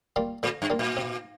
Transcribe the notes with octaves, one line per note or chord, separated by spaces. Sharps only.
G3 A#3 F4
A#2 D3
G2
G3 A#3 F4
A#2
C3